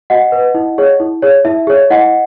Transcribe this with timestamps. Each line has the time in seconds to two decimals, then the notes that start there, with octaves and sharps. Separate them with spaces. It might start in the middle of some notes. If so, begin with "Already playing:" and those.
0.10 F#4 D#5 F#5
0.32 B4
0.54 E4
0.78 G#4 C#5
1.00 E4
1.22 G#4 C#5
1.45 E4 E5
1.67 G#4 C#5
1.90 E4 D#5 F#5